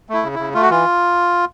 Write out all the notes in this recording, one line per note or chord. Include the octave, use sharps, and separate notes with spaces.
A3 E4
C#3
C#3 E4
A3 F4
F#4
E3 F4